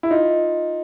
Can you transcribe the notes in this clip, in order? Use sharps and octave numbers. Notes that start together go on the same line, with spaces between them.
E4
D#4 F4